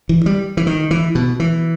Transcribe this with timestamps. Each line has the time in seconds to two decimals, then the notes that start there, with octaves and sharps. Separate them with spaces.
0.09 E3
0.26 G3
0.57 E3
0.67 D#3
0.91 E3
1.15 B2
1.40 E3